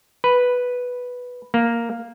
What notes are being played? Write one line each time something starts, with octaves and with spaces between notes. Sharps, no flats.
B4
A#3